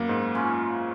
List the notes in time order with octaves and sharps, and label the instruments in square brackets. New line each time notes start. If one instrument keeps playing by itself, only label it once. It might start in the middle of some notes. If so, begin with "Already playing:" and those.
Already playing: [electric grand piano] F#2 A#3 [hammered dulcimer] B3
[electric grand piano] G#2
[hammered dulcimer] C#4 F4